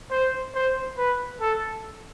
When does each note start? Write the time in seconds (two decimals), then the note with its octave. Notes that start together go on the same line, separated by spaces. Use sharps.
0.11 C5
0.55 C5
0.98 B4
1.41 A4